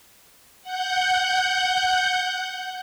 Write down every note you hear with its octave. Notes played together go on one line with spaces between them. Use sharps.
F#5 G6